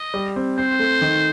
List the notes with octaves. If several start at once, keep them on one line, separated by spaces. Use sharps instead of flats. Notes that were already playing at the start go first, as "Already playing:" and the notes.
Already playing: D#5
G3
C4
C4 C5
A3
D#3